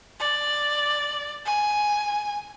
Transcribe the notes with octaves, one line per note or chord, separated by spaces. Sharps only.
D5
G#5